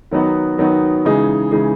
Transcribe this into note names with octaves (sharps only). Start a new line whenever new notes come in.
D#3 F#3 B3 D#4 F#4
D#3 F#3 B3 D#4 F#4
C#3 E3 G#3 D#4 G#4
C#3 E3 G#3 D#4 G#4